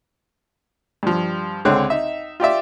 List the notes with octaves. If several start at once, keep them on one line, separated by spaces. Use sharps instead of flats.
G2 F3
C#2 D3 G#3 C4 C#5 F#6
D#4 E5
F4 G4 D5 E5